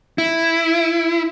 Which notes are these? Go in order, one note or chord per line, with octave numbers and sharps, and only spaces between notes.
E4